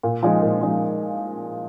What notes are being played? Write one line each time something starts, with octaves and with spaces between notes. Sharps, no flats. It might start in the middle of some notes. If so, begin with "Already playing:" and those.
A#2
F3 G#3 D#4
A#2
F3 G#3 D#4